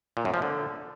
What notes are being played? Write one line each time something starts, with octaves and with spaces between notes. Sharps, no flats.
A#2
F#2
F3
D3